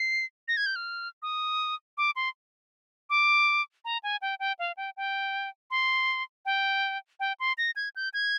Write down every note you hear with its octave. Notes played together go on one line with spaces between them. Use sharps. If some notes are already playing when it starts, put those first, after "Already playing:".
Already playing: C7
A#6
G#6
G6
F6
D#6
D6
C6
D6
A#5
G#5
G5
G5
F5
G5
G5
C6
G5
G5
C6
A#6
G#6
G6
G#6